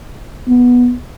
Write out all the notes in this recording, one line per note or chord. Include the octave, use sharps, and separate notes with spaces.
B3